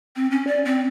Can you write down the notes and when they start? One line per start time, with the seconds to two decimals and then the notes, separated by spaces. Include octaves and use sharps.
0.16 C4
0.31 C#4
0.47 D5
0.65 C4